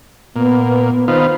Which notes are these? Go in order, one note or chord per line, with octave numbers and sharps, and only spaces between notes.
A#2 B3
D#3 B3 F4 C5